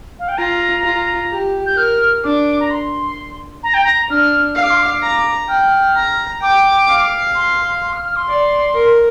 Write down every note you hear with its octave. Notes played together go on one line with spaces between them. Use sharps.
F5
G5
F4 A#5
F4
G4
G6
A#4 F6
D4 D6
A#5
C6
A#5
G5
A#5
D4 F6
F5 F6
D6
C6
D6
A#5
G5 F6
A#5
G5 D6
F5
C6
C6
F6
F6
C6
D5
A#4